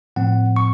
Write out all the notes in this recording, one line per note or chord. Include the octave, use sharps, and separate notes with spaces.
A2 F3 C4 F#5
C#6